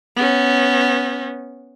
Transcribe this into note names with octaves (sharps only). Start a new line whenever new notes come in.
B3 C#4